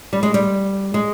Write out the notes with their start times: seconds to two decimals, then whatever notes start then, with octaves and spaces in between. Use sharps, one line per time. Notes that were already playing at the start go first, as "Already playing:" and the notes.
0.13 G3
0.23 G#3
0.34 G3
0.94 G#3